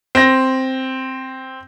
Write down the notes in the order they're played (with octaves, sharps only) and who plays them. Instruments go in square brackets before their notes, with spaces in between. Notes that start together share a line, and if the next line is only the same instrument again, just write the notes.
[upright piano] C4 A#6